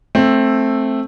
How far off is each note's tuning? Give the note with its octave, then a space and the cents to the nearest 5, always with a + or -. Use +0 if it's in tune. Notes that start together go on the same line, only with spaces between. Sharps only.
A3 +0 C4 +10